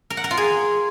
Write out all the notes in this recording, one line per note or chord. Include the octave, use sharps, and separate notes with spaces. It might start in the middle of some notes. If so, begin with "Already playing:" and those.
A#4
F#5
A#4
F4
G#4